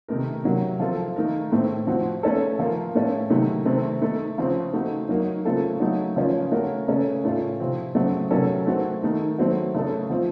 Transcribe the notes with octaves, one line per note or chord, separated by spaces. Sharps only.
C3 D#3 A3 D#4 A#4
C3 F#3 A#3
F3 C4 F4 A4
D#3 A3 D#4 A#4
A2 A3 C4
F3 C4 F#4
A3 C#4 A4
F3 A#3 F4 A#4
A2 A3 C#4 A4
C3 D#3 F#3 A3 D#4
C3 D#3 A3 C4
A3 D#4 A4
C#3 F3 C4
A3 C4 D#4 F#4 A4
F#3 A#3 D#4 F#4
C#3 A3 C4 F4 A4
F#3 A3 D#4
C#3 F3 A#3 C#4 F4
A3 C#4 F#4 A#4
C#3 A3 C#4 A4
A2 A3 C#4 F4
C3 F3 C4
C#3 F#3 A3 C4 F#4
C3 F#3 A#3 C#4 A4
A3 C4 F#4
D#3 A3 D#4
D#3 F#3 A3 C4 F#4
C#3 A3 C#4 A4
F3 C4 F4